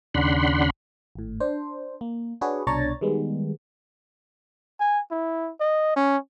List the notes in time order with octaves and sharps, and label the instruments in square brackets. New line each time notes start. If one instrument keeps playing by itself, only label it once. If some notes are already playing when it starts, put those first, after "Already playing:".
[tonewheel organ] D#2 C#3 D4 F#5 B5 C6
[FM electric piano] G#1 A2
D4 C5
A#3
D4 F#4 G#4 B4 C#5
C2 B2 D4 C#5 A#5 A6
D#3 G3 G#3 B3
[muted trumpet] G#5
E4
D#5
C#4